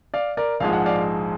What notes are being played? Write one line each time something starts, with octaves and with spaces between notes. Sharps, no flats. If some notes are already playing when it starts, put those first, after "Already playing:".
D5 F5
A#4 D5
A#1 G#2 F3 G#3 F5
F#5
D5 F5